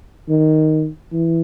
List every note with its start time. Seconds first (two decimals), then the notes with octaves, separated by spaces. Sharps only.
0.29 D#3
1.13 E3